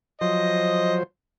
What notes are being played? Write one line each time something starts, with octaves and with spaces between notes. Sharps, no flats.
F3 F#3 C5 D#5